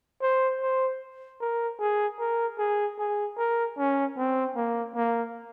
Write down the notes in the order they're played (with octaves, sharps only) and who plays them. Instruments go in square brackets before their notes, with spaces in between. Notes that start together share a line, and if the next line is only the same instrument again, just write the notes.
[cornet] C5
C5
A#4
G#4
A#4
G#4
G#4
A#4
C#4
C4
A#3
A#3